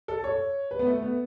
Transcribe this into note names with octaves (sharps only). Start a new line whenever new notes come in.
A4
C#5
B4
B3
A3
B3